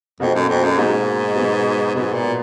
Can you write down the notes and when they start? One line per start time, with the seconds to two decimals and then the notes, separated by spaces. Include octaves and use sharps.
0.20 F2 B2 A#3 D#4 F#4
0.35 F#2
0.48 F2
0.64 F#2
0.77 G#2 B2 A#3 D#4 F#4
1.36 B2 F#3 B3 F#4
1.94 G#2 B2 F#3 B3 F#4
2.13 A#2